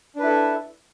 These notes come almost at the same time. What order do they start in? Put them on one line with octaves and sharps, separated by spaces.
D4 B4 E4 A4 E5